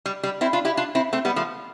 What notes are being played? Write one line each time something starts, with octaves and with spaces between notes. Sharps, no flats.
G3
G3
C4 E4
D4 F4
E4 G4
D4 F4
C4 E4
A3 C4
G3 B3
F3 A3